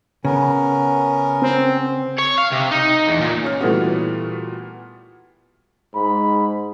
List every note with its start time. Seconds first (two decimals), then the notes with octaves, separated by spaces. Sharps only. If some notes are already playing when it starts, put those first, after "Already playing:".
0.25 C#3 B3 C#4 A#4
1.42 C4
2.19 C#5
2.38 F5
2.52 C3
2.72 D#4
3.09 E2
3.21 A#2
3.44 C#4 F6
3.61 A#2 E3 G3 A3 B3 F#4
5.95 G#2 B5